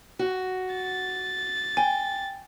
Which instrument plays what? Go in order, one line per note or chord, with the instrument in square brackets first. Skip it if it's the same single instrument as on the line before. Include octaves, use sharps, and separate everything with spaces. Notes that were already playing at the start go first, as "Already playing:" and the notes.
[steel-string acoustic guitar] F#4
[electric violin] A6
[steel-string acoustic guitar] G5 [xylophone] G#5